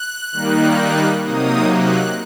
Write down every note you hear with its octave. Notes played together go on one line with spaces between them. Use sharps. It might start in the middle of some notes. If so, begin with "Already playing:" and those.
Already playing: F#6
D#3 G3 A#3 D#4
C3 F#3 A#3 D#4 D#6
F#6